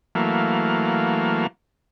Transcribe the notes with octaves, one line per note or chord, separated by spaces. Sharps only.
E3 F#3 A3 A#3 F5